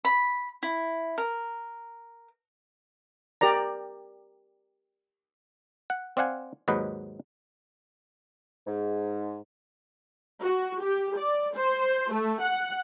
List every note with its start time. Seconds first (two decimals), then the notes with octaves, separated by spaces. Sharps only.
0.05 B5
0.63 E4
1.18 A#4
3.41 G4 A#4 D5 A#5
5.90 F#5
6.17 C4 D5 F5 F#5 G#5
6.68 D#2 G#2 F#3 B4 D#5
8.66 G#2
10.43 F#4
10.82 G4
11.17 D5
11.56 C5
12.13 A3
12.43 F#5